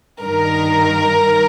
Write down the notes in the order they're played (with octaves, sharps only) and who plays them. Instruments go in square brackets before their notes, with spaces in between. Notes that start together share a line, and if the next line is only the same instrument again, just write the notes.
[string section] G2 D#3 A#4